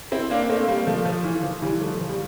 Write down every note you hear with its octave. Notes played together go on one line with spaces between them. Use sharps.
C4 E4
A#3 D4
A3 C4
G3 A#3
F3 A3
F3
E3
F3
E3 G3
F3 A3
F3
G3